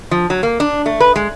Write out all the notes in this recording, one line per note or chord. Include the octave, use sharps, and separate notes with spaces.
F3
F#3
A#3
D4
A3
B4
G#3